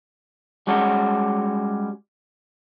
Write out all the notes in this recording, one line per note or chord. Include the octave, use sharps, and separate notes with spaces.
G3 G#3 C#4 F#4